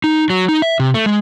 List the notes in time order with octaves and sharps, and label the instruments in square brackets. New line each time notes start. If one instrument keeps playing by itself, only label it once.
[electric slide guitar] D#4
F#3
D#4
E5
C3
A3
G#3